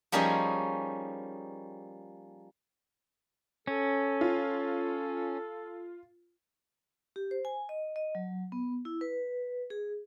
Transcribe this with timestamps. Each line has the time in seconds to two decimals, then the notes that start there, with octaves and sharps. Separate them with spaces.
0.12 F3 G3 A#3 C#4 D#4 G#4
3.67 C#4 A4
4.21 F4
7.16 G4
7.31 C5
7.45 G#5
7.69 D#5
7.96 D#5
8.15 F#3
8.52 B3
8.85 E4
9.01 B4
9.70 G#4